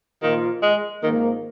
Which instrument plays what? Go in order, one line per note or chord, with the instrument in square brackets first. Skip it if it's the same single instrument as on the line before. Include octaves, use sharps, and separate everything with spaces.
[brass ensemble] A#2 F3 A#3 F4 [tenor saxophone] D#3
[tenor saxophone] G#3
[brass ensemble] G#1 G#2 F3 A#3 [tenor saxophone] D#3